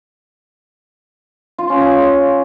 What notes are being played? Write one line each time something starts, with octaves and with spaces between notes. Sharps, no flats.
F4
C#4
G#4